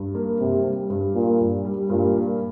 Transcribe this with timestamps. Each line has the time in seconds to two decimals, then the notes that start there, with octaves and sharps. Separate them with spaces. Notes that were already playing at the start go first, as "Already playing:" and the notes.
Already playing: G2
0.15 A#3
0.39 G2 C3
0.65 G3
0.90 G2
1.15 A#2 A#3
1.40 G2
1.65 G3
1.89 G2 A#2
2.15 A#3